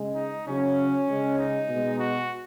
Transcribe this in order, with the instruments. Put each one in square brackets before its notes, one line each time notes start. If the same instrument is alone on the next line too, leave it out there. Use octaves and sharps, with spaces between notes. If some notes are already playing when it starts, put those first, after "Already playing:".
Already playing: [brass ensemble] C#3 G#3
D#4
C#3 F#3 C#4
C#3 G#3
D#4
B2 G#3
F#4